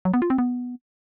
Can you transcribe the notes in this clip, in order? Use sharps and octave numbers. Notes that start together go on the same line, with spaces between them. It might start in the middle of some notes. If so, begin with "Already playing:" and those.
F#3
B3
F4
C4
B3